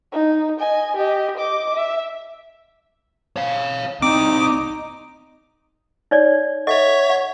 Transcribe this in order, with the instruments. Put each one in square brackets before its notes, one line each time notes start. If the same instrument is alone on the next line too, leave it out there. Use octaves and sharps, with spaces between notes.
[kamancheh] D#4
D#5 G#5
G4 D#5
D#5 D6
E5
[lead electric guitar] C#5 F5
[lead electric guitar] C4 D5 [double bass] D#4 [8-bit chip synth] D6
[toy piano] D#4 C#5 D5
[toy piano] A4 D#5 F#5 [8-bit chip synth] C#5 E5 C#6
[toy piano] F#5